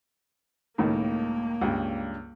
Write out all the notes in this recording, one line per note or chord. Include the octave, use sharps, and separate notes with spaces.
C#2 A2 D#3 A#3
C#2 G2 G3